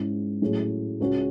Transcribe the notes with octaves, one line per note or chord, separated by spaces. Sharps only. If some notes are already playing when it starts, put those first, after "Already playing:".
Already playing: G#2 G#3 C#4 E4
A2 F#3 C#4 G#4
C#2 C#3 G#3 C#4 F#4